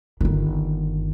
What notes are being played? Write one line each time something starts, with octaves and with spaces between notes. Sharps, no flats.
G1 D#3